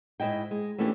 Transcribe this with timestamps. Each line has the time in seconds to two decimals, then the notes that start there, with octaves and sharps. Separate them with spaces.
0.20 G#2 F#3 E4 D#5 G5
0.51 G#3
0.78 E3 A3 A#3 C#4 D4 G4